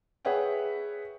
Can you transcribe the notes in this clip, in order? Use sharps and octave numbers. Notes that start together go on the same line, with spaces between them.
G#4 B4 C#5 E5 F#5 G5